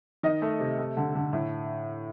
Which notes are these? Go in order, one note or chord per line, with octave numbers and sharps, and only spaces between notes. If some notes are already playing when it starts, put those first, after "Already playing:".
D#3 D#5
A3
C3
A3
D3
D3
A2